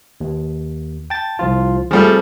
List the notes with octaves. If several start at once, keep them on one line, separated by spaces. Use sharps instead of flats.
D#2
G5 A5 A6
C2 F3 F4
F3 G3 A3 C4 G#4